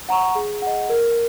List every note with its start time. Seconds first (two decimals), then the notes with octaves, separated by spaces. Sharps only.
0.09 F#5 A#5 C#6
0.35 G#4
0.62 D#5 F#5
0.89 A#4